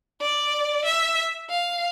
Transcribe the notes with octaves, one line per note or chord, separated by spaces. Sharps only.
D5
E5
F5